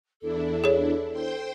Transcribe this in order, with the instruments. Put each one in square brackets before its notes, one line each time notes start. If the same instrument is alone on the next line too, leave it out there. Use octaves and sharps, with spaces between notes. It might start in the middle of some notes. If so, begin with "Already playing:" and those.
[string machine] E2 D4 E4 [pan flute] A4
[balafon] G#4 C#5
[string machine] C5 G5 C6